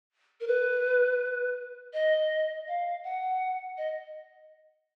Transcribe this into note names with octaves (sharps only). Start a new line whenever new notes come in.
A#4
B4
D#5
F5
F#5
D#5